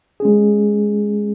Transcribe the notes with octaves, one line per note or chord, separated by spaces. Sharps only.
G#3 C#4 G#4